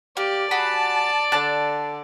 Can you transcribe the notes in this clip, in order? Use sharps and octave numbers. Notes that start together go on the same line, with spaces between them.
A#3 G4 D5
F#4 G#4 A5 B5
D3 D4 A5 F#6